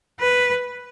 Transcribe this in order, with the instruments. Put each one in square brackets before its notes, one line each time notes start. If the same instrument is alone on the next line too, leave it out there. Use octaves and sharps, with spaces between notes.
[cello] B4